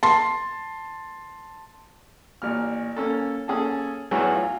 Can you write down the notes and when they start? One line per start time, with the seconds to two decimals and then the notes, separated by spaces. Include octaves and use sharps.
0.03 A5 C6
2.42 A1 A#2 F6
2.96 A#3 C#4 A4
3.48 A#3 C#4 G#4 A4 A5
4.11 E2 A2 E3 F#3
4.35 F4